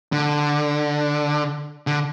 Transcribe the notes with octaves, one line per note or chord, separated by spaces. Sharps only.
D3
D3